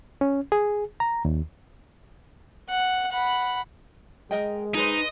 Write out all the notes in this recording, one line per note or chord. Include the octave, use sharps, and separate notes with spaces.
C#4
G#4
A#5
D#2
F#5
F#5 B5
G#3 A#4 D#5 G5
D#4 G#4 B4 C5 D#5